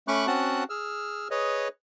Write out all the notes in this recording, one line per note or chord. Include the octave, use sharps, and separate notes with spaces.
A3 C#4 B5 C#6 D6 F#6
C4 C#4 F#4 F#5 A5 F#6
G#4 E6 F6
G#4 B4 C#5 D#5